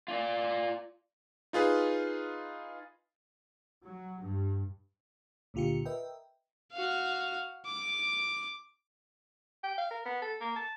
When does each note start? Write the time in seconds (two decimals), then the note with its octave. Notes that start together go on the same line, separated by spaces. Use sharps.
0.08 F4 D5
1.53 D#4 F4 G#4 B4
3.82 F#3
4.20 G2
5.54 C#2 A#2 D3 F4 G4 C#7
5.85 A#4 B4 D#5 E5 G5
6.73 F#4 F5
7.66 D6
9.64 G5
9.78 F5
9.91 A#4
10.05 B3
10.22 A4
10.41 A#3
10.56 A5